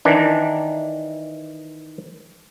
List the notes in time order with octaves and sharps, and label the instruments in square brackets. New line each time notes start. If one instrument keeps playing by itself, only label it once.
[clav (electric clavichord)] D#3 E3 D4